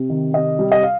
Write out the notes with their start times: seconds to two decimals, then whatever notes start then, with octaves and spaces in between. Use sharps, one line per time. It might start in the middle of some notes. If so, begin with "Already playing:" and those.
Already playing: C3
0.10 D#3
0.34 C3 D#5
0.59 G3
0.72 D#5
0.83 F5